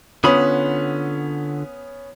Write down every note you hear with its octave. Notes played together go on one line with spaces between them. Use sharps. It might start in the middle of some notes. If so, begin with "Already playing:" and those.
D3 B3 C#4 F4 B5 D#6